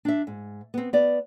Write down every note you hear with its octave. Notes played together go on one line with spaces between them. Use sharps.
D4 E5
G#2
B3 C4
B3 D5